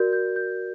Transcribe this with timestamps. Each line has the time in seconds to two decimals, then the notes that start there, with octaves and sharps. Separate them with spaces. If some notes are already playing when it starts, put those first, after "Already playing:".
Already playing: F#4 A#4 D5 G6
0.13 G6
0.36 G6